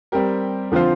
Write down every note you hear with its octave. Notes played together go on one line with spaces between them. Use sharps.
G3 C4 G4 A#4
D3 F3 C4 F4 C5